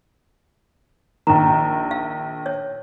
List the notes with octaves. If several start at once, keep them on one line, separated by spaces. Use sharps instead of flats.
A#1 D#3 A#5
F5
C#5